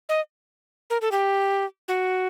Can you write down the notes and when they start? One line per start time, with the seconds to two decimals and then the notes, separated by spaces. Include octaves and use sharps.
0.09 D#5
0.90 A#4
1.01 A4
1.12 G4
1.88 F#4